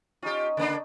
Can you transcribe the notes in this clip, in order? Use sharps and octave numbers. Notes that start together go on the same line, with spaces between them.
C#4 D#4 F4 G4 D#5
C#3 A#3 D4